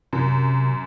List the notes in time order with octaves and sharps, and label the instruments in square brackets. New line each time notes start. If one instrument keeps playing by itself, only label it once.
[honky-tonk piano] F#2 [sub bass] C3